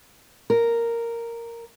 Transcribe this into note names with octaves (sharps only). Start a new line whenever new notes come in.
A#4